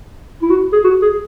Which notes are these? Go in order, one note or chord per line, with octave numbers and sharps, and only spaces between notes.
E4
F#4
G#4
F#4
G#4